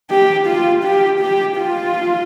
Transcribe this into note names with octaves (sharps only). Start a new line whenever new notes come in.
G4
F4
G4
G4
F4